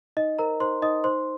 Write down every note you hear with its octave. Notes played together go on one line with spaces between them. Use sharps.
D#4 D#5
A#4 C5 A#5
D#4 C5 C6
D#4 D#5 D#6
D#4 C5 C6